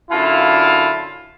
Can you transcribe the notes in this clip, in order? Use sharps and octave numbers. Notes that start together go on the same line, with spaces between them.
F#2 D3 E4 F4 F5 A5